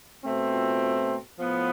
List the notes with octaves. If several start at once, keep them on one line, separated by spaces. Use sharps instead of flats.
B2 A3 C4
F4
A2 F3 B3